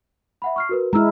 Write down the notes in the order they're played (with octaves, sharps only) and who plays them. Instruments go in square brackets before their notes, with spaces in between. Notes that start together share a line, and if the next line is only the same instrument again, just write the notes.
[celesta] E5 F#5 B5
C#6 F6 C7
F#4 A#4 B4
[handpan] G#3 E4 [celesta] A#5 E6 F6